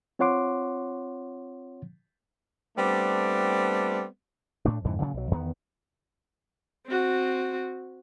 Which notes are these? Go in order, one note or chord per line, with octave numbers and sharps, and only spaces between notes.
C4 F4 C#5 F#5 C6 D6
G3 A3 B3 C4 D4
A2 A3 D4
F2 G#2 D3 E3
A#2 C#3 E3 F#3
B1 F#3
E2 D#3 B3
C4 F#4